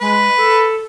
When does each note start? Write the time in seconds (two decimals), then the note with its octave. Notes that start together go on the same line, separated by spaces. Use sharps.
0.01 G#3 B4
0.37 A4